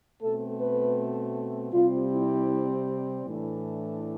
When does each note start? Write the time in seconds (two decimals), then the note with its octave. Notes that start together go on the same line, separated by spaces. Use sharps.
0.22 B2 A3 C4 A4
0.59 B4
1.73 C3 G3 C4 F4
2.12 E4
3.25 A2 E3 A3 D4